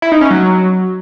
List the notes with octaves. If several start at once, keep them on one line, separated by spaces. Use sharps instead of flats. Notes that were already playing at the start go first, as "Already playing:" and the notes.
E4
D#4
C#4
F#3